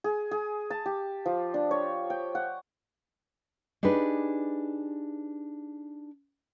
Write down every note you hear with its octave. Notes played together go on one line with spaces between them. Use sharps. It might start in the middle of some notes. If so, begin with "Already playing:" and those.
G#4
G#4
A5
G4
F3
D4
C#5
G5
F#5
D4 D#4 G4 G#4 B4